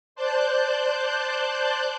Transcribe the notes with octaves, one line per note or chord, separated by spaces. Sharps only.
C5 D5 A5 F#6 G6